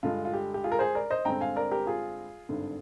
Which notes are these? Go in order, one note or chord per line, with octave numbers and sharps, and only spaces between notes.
G2 D3 G#3 F4
F4
G4
G4
F4 G#4
A#4
G#4 C5
A#4 D5
C5 D#5
G2 D3 G#3 C4 G5 A#5
F5 G#5
A#4 D5
G4 A#4
F4 G#4
G#1 G2 D3